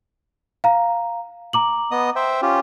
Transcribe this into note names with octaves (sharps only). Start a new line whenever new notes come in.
F5 A#5
A#5 D6 F#7
B3 D#5 D#6
C5 E5 G5
C#4 F4 G4